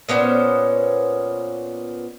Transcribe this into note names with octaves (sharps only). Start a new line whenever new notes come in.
A#2 B3 C#4 C5